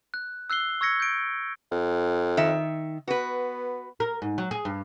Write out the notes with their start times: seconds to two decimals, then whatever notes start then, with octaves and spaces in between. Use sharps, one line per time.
0.14 F#6
0.50 E6 F#6 C7 G7
0.81 C#6 E6 G#6 A#6 C#7
1.00 G6 D7
1.71 F2
2.37 D#3 E5
3.08 B3 F#4 B4
4.00 A#4
4.22 G#2
4.38 F#3
4.51 G#4
4.65 G2